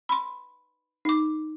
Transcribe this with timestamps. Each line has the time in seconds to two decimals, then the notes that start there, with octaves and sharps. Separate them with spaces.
0.09 B5 C6
1.05 D#4 D6